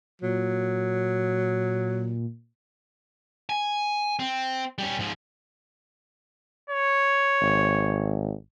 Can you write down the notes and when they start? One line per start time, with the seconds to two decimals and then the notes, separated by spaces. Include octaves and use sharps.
0.22 A#2 F#3
3.49 G#5
4.19 C4
4.78 G3 C#4
4.99 G#2 F3
6.70 C#5
7.42 G#1